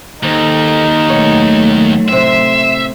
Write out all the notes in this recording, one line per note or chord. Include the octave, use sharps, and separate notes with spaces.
D#2 G#2 D#4 A4
B2 D#3 F#3 A3 C#5
A2 C3 E5 C6